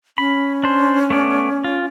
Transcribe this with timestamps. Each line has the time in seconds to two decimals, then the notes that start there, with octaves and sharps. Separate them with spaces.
0.18 C#4 B5
0.64 D4 C5
1.10 A3 B3 D5
1.64 F4